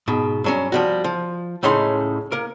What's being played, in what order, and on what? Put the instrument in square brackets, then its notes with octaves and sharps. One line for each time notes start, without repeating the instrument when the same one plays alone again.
[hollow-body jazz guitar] G#2 B2
G2 F#3 C#4
F3 G3 F#4
F3
C#2 A2 C#3 C#4 D#4 C6
A#3 A#4